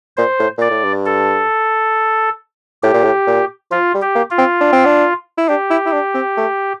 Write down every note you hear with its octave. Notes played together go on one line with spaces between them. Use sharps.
A#2 C5
A2
A#2 D5
A2
G2
A4
A2 G4
A#2
A2
A#2
F3 F4
G3
G4
A#3
F4
C4
D4
C4
D4
E4
D4 G4
E4
E4
D4
C4
A3